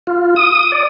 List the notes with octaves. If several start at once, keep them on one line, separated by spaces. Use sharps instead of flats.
F4
D#6
D5